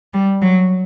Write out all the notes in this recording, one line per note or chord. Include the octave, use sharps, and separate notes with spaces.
G3
F#3